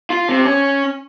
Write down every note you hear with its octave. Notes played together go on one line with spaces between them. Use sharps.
F4
C3
C#4